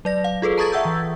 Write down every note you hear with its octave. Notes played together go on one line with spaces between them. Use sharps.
F#3 D5 A#6
F5
F4 G#4 A4 B4
A5 A#5 C#6 D#6 G#6 A6
E5 F#5 E6 G6
E3